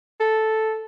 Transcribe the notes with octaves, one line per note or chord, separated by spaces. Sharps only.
A4